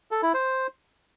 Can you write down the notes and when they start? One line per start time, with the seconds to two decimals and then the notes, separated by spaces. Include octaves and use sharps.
0.11 A4
0.23 E4
0.34 C5